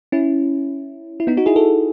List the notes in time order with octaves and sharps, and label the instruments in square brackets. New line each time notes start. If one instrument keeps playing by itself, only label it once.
[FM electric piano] C#4 E4
E4
B3 D#4
D#4 F#4
E4 G#4
F#4 A4